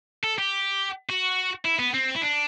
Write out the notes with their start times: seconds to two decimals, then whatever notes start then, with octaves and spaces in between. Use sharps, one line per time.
0.23 A4
0.38 G4
1.09 F#4
1.65 E4
1.79 B3
1.94 C4
2.15 E4
2.21 D4